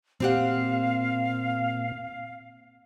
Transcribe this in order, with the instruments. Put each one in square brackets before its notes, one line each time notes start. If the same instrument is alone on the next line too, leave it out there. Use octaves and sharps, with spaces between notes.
[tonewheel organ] A#2 [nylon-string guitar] C4 G4 F#5 [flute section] F5